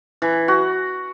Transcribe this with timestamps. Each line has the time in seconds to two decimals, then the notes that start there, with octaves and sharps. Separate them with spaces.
0.22 E3
0.48 F#4